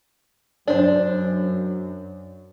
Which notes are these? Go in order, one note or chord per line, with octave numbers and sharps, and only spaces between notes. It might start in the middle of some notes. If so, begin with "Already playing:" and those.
F#2 D4 C5